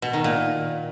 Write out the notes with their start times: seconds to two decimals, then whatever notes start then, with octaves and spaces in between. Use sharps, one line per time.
0.02 B2
0.13 D#3
0.24 A#2